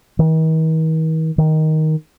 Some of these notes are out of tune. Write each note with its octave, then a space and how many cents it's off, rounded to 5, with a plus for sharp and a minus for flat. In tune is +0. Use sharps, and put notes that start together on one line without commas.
D#3 +45
D#3 +10